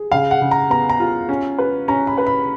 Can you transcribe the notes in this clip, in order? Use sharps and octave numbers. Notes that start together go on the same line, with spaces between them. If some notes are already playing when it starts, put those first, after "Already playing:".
Already playing: G#4
C#3 F5
F#5
C#3
A#5
B3 A#5
A#5
F4
C#4
B4
C#4 A#5
B5
B4
B5